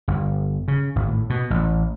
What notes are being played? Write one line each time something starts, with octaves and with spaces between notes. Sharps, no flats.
G1
C#3
G#1
A2
B2
A1